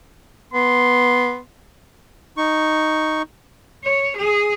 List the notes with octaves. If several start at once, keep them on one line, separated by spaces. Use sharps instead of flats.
B3 C6
D#4 C#6
C#5
G#4